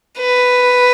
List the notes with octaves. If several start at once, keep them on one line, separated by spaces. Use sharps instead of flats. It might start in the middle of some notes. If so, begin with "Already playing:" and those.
B4